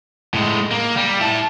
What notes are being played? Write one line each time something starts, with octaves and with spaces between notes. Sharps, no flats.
A2 G#3
A#3
G3
E4 A5